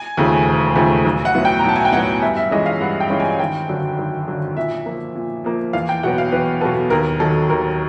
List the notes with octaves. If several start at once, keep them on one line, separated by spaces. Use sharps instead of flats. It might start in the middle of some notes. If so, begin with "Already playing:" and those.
Already playing: G#5
D#2 C#3 F3 A3
E1
D#2 C#3 F3 A3
B1
F#5
A2 F#3 B3
G5
A#5
B1 A5
G#5
G5
A2 F#3 B3 F#5
G2 E5
E5
E3 G#3 C#4 F4 D#5
F5
G2 F#5
G5
E3 G#3 C#4 F4
G#5
G#1 G5
F#2 D3 F#3
G#1
F#2 D3 F#3
A#2 E5
F3 A#3
A#2
F3 A#3
E2 F5
G5
B2 F#3 B3 F#5
F5
E2 B4
B2 F#3 B3 A4
D#2 A#4
D#3 F#3 A4
D#2 A#4